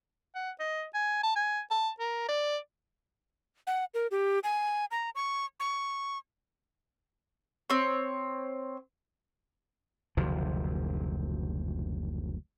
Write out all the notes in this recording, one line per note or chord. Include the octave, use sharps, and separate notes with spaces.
F#5
D#5
G#5
A5
G#5
A5
A#4
D5
F#5
A#4
G4
G#5
A#5
C#6
C#6
C4 C#5
F#1 D2 C3 F3